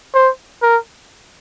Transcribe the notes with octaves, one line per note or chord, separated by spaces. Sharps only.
C5
A#4